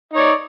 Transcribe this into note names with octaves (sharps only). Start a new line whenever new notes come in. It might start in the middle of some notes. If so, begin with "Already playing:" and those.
D#4 C#5 D5